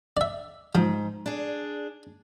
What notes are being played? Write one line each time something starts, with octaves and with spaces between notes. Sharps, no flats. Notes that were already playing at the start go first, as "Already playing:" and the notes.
D5 E5
G#2 F3
D4 G#4